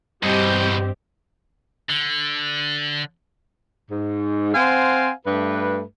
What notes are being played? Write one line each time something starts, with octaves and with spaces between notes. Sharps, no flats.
E2 G2 B2 G3 C4 G4 D#5 G6
D3
G#2
C4 C5 F5 F#5 G#5
G2 A3 B4